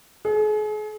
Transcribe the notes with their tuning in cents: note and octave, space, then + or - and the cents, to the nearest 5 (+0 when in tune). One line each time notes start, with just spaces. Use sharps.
G#4 +40